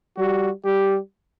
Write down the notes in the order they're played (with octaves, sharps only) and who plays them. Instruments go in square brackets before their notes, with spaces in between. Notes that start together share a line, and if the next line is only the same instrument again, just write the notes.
[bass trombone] G3 [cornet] F#4
[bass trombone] G3 [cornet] G4